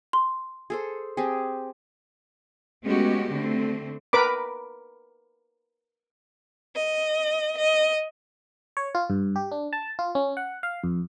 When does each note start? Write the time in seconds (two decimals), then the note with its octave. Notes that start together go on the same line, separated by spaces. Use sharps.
0.13 C6
0.70 G#4 A4 C5
1.17 C4 G4 G#4
2.84 G#3 A3 B3 C#4 F#4 G4
3.32 D3 A3 C4
4.13 A#4 B4 B5 D6
6.76 D#5
7.58 D#5
8.77 C#5
8.95 F4
9.10 G2
9.36 G4
9.52 D4
9.73 A5
9.99 F4
10.15 C#4
10.37 F#5
10.63 F5
10.84 F2